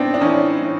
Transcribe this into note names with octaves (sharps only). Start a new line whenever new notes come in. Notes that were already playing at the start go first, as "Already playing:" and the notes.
Already playing: A2 B3 C4 D4 D#4
D4
E3 C#4 D#4
A2